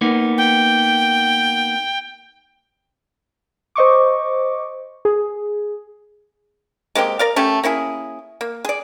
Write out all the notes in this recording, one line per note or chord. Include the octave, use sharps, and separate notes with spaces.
A#3 B3 D#4
G5
C5 D#5 C#6 D6
G#4
G#3 A#3 C4 G4
A#4 D5 F5
A3 C#4 G4 A4
A#3 C#4 E4 G#4
A#3
G#4 D5